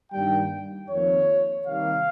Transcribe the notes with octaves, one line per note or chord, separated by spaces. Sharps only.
G2 D#3 G3 A#3 G5
F2 D#3 A#3 C#5
C3 D#3 G3 A#3 F5